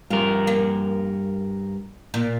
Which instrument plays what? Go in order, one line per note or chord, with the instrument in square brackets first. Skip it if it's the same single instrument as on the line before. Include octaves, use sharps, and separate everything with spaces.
[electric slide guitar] G2 A#4 [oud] F4
[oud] A#3
A#2